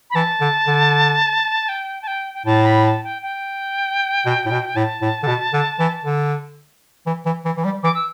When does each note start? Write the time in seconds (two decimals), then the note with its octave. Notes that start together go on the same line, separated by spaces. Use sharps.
0.10 B5
0.15 E3 A5
0.41 D3
0.67 D3
1.69 G5
2.02 A5
2.07 G5
2.34 G5
2.46 A2 A5
2.65 B5
2.84 A5
3.04 G5
3.22 G5
4.25 B2
4.46 A2
4.51 B2
4.76 A2 A5
5.02 A2
5.23 D3
5.27 B2
5.53 D3
5.79 E3
6.04 D3
7.06 E3
7.26 E3
7.45 E3
7.57 E3
7.64 G3
7.83 E3 D6
7.95 E6